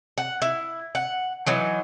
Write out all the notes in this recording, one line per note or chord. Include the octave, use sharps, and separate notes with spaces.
F#5
E4
F#5
E3 F#3 D#4